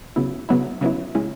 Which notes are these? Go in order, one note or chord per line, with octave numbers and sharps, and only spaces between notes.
C#3 F#3 B3 E4
C#3 F#3 B3 E4
C#3 F#3 B3 E4
C#3 G#3 C#4 E4